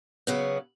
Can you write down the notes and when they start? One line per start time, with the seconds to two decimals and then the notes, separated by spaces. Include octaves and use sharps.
0.27 C#3 F#3 B3